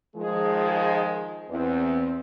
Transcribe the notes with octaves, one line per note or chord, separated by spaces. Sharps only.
D#3 F3 G#3 G#4
E2 C4